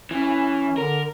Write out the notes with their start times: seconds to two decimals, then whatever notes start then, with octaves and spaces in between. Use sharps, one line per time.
0.11 E3 C#4
0.78 D3 A#4